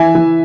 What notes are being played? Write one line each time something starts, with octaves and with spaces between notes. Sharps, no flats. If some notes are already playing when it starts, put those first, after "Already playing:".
Already playing: E3 E5 G#5
E3